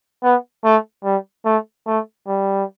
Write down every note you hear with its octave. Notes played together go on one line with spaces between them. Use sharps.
B3
A3
G3
A3
A3
G3